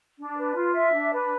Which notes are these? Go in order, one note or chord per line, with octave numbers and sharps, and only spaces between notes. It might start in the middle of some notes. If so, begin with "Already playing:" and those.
D4
B4
F4
E5
D4
B4